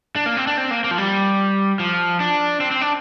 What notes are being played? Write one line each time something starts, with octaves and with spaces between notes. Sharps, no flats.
D4
A#3
C4
D4
C4
A#3
A#3
F3
G3
F3
D4
C4
C4
D4